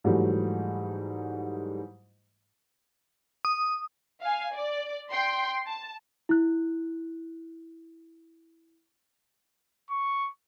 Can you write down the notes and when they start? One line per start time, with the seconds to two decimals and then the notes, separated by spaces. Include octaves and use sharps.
0.04 G#2 E3 F#3 G3 A3
3.45 D#6
4.21 F5 G#5
4.54 D5
5.11 G5 C6
5.67 A5
6.29 E4 F#6
9.91 C#6